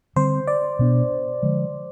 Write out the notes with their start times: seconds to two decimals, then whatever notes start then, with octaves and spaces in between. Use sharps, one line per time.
0.16 D3 G3 C4 C5
0.48 D5
0.79 B2 B3 D4
1.42 D3 F3 G#3